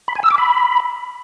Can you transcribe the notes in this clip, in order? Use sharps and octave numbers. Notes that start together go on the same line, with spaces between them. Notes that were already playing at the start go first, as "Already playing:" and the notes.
B5
G#5
E6
D6
B5